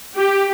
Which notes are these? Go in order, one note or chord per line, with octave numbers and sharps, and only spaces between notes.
G4